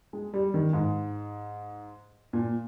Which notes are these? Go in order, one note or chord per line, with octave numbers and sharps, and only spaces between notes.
G#3
G3
D#3
G#2
A#2